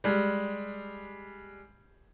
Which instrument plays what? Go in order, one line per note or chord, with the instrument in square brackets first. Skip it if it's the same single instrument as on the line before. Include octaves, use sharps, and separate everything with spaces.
[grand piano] G3 G#3